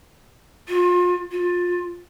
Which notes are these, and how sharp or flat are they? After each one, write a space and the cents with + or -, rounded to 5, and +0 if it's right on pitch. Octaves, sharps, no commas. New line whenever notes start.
F4 +30
F4 +20